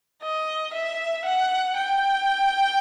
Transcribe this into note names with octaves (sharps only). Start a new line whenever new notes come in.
D#5
E5
F#5
G5